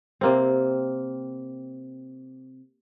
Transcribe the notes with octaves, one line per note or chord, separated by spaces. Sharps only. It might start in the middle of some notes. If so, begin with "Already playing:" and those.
C3 A#3 C4